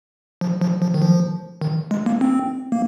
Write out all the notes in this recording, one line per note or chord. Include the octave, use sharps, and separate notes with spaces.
F3
F3
F3
D#3
F3
D#3
G#3
A#3
C4
A#3